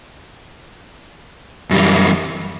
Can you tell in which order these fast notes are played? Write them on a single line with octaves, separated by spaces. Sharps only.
F#2 G3 E3